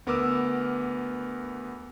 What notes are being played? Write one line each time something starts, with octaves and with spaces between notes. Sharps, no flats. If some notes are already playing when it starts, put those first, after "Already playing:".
D2 B3 A#4 D6 E6 F6